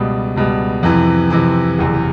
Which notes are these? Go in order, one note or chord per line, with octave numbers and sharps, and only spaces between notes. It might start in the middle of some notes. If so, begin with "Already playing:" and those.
Already playing: C#2 B2 G3
C#2 B2 G3
F2 C3 E3
F2 C3 E3
F#1 E2 C3